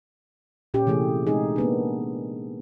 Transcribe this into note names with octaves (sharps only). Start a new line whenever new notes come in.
A#2 C#4 G4
C3 E3 A3 G#4
G#3 C4 D#4 G#4
A#3 B3 D4